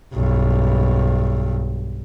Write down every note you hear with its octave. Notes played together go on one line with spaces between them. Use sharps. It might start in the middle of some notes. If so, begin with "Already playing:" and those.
B1 G2